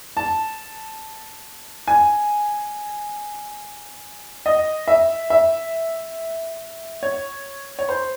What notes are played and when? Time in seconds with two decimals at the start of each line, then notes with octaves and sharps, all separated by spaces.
0.17 A5
1.87 G#5
4.46 D#5
4.88 E5
5.30 E5
7.03 C#5
7.79 C#5
7.89 C5